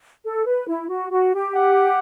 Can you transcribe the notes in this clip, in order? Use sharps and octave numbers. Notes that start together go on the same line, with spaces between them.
A4
B4
E4
F#4
F#4
G4
F#5